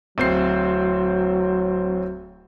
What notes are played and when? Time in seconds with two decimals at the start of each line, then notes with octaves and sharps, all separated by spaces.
0.18 D1 F#3 C4 C7